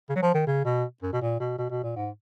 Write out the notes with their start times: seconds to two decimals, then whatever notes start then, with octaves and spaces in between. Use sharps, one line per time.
0.09 C#3
0.16 F#3
0.22 F3
0.34 D#3
0.47 C#3
0.65 B2
1.03 F#2
1.13 B2
1.22 A#2
1.40 B2
1.58 B2
1.71 B2
1.83 A#2
1.96 G#2